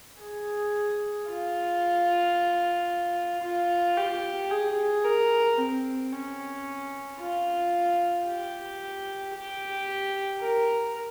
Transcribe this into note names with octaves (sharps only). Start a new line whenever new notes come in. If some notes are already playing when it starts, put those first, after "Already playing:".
G#4
F4
F4
G4
G#4
A#4
C4
C#4
F4
G4
G4
A#4